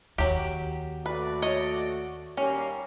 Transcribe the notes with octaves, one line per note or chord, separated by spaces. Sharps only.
D#2 F#3 G4
A3 F#4 B4 D5
C#5 D#5
D#2 G3 A#3 C#4